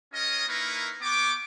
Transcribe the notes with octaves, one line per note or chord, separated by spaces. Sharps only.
C#4 F4 A#4 D#5
A#3 D#4 E4 A#4 B4 C#6
B3 G5 C#6 D6